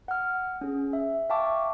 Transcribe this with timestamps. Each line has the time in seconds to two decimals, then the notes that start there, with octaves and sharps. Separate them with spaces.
0.08 F#5 F6
0.61 C#4 G#4
0.93 E5
1.30 E5 F5 G5 A5 C#6 D6